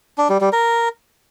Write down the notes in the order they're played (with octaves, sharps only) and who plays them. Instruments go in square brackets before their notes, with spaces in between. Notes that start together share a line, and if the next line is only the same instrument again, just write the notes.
[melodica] D4
G3
G3
A#4